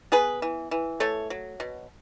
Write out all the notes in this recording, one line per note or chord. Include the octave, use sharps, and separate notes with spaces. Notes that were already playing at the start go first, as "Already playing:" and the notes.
B3 G#4 B4
E3
E3
A3 A4 C#5
F#3
B2